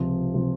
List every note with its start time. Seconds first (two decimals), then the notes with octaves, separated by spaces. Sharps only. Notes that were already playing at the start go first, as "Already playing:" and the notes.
Already playing: C#2 C3 F3
0.34 C3 F3